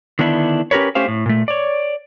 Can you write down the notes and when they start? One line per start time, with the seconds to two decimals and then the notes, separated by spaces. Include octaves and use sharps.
0.19 D3 D#3 B3 D4 E4
0.71 C#4 G4 A#4 B4 C#5
0.95 A3 C#4 G4 C5 F5
1.08 A2
1.26 A#2 A3
1.48 C#5 D5